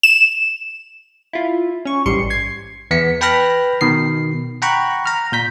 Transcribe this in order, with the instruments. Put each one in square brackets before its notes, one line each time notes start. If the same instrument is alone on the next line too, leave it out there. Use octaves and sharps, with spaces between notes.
[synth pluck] E7
[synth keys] E4 F4
C#4 C#6
A1 G#2 G3 C6 C#7
G#6 C7
[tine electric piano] E2 B3 B6 C#7
B4 G5 A5 B5 F6 A#6
B2 D#3 C7
F#5 G5 A#5 B5 C#6 F#6
A#5 F6
A#2 G6 B6